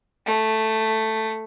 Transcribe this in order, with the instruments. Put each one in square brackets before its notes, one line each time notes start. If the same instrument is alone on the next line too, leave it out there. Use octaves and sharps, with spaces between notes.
[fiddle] A3